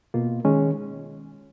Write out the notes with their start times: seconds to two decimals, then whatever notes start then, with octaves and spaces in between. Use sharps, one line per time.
0.14 B2 A#3 F4
0.45 D#3 G#3 C#4